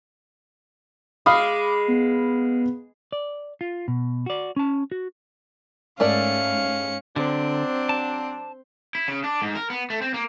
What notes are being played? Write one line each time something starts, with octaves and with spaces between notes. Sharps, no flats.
G#3 F5 B5 D6 D#6
B3
D5
F4
B2
F#4 D5
C#4 A5
F#4
G#2 A3 C#4 A#4 D5 F5 C#7
D3 F#3 C4 D4
A5
E4
C#3
D4
G#2
A#4
B3
A3
C4
A#3